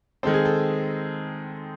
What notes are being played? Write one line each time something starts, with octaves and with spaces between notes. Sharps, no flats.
D#3 G#3 C4 A4
G#4
A4